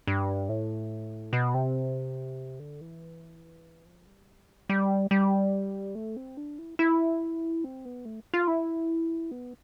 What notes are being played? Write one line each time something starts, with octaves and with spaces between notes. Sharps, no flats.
G2
A2
B2
C3
D3
E3
F3
G3
G3
G3
A3
C4
D4
E4
E4
C4
B3
A3
F4
E4
B3